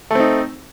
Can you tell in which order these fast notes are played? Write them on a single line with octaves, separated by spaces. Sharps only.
A3 C4 D#4